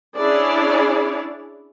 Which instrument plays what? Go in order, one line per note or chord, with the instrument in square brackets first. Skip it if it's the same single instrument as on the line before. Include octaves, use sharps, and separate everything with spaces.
[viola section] C#4 D4 E4 G#4 C#5 D5